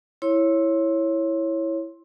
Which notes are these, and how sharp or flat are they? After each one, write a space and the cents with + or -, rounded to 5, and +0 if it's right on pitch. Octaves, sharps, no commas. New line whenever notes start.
E4 +0 C#5 -10 C6 +20